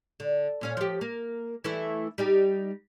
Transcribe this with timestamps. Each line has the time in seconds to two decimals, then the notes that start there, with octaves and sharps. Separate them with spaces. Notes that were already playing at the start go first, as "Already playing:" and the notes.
0.20 D3
0.61 A#2 C#4 F5
0.77 F3 G4
1.01 A#3
1.64 E3 A3 E4
2.18 G3 D#4 G4